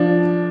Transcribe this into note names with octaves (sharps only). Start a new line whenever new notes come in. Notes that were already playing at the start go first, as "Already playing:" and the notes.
Already playing: F3 D4